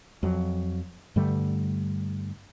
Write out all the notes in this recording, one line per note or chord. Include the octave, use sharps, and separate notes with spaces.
F2 F#3
G2 D3 G3 A3